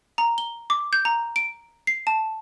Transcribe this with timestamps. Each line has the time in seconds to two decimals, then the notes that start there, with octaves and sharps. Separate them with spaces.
0.18 A#5
0.38 G7
0.70 D6
0.93 G6
1.05 A#5
1.36 D7
1.87 C7
2.07 A5